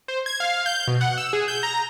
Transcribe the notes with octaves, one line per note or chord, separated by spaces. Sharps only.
C5
G#6
F5
G6
B2
F#5
E6
G#4
G6
A#5